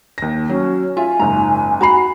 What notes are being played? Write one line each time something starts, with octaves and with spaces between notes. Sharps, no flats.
D#2 A#6
F#3 C#4
F4 E5 G#5
F#1 G#2 A#5
F#4 F#5 A#5 B5 C7